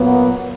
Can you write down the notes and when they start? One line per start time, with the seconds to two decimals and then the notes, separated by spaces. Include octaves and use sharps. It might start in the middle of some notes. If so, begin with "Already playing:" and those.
Already playing: A#2 F#3 A#3 B3